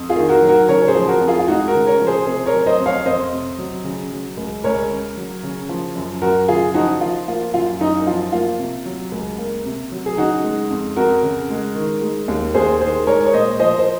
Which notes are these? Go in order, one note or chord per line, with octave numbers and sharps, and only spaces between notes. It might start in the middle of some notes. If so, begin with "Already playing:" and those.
Already playing: F2
F4 G#4
D#3
F#4 A#4
F#3
F#4 A#4
C#3 A#4 C#5
C#5
G#4 C5
F3
F#4 A#4
F2
F4 G#4
F4
G#3 D#4 F#4
F#4 A#4
C#3
A#4 C#5
F3
G#4 C5
C3 G#4 C5
A#4 C#5
F#3
C5 D#5
F2
C#5 F5
F2 C5 D#5
C3
F#3
C#3
F#3
C#2
C#2 A#4 C#5
C#3
F#3
C#3
F3
F#2
F#2 F#4 A#4
C#3 F4 G#4
F3 D#4 F#4
F3 F4
A#3 F4
F#2 F4
F#2 D#4
D#4
F3 F4
A#3 F4
C3
F#3
C#2
A#3
C3
F#3
G#4
C#3 D#4 F#4
G#3
F2
F2 F#4 A#4
C#3
G#3
D#3
G#3
D#2
D#2 G#4 C5
D#3 G#4 C5
G#3 A#4 C#5
C#5
A#2 C5 D#5
F3 C5 D#5
C5